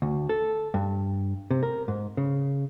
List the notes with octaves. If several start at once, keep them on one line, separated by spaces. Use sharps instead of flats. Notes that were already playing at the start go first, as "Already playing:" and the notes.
D2
A4
G2
C3
A#4
G#2
C#3